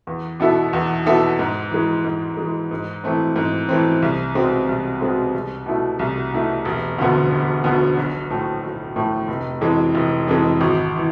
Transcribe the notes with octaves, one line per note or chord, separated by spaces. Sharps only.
E2
B2 B3 E4 A4
E2
B2 B3 E4 A4
G#2
E3 G#3
G#2
E3 G#3
G#2
E3 A3 C4
G#2
E3 A3 C4
C2
B2 G#3 C4
C2
B2 G#3 C4
C2
B2 A3 E4
C2
B2 A3 E4
E1
D2 D3 F3 B3
E1
D2 D3 F3 B3
B1
A2 F3 A3
B1
A2 F3 A3
F1
F2 E3 G#3
F1
F2 E3 G#3
G#1
E3